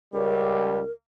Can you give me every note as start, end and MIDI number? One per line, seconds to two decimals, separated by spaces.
0.13 0.79 37
0.13 0.79 55
0.13 0.91 70